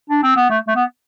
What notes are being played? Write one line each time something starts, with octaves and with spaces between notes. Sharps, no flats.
D4
C4
B3
A3
A3
B3